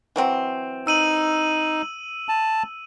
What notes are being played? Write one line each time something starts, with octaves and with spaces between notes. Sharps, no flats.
E3 F#3 C4
D#4 E6 D#7 F#7
A5